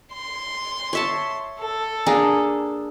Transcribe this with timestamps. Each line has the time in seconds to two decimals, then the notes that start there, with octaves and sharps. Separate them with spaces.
0.12 C6
0.93 C#5 E5 A5
1.59 A4
2.06 A#3 D4 G#4